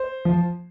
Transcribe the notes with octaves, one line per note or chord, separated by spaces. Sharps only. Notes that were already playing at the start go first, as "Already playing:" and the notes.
Already playing: C5
F3